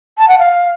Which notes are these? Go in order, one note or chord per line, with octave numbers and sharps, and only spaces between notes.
A5
F#5
F5